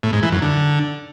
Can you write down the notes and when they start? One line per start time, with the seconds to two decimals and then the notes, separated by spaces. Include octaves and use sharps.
0.03 A2
0.13 G#2
0.23 E3
0.32 F#2
0.42 D3